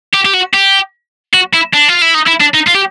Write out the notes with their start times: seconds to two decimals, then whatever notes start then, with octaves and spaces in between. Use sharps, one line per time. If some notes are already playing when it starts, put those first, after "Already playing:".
0.14 G4
0.25 G4
0.33 F#4
0.54 G4
1.34 F#4
1.54 E4
1.74 D4
1.88 F4
2.02 E4
2.15 D#4
2.28 E4
2.41 D4
2.55 D#4
2.68 F4
2.75 G4